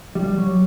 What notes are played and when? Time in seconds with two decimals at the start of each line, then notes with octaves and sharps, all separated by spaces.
0.15 G3
0.37 F#3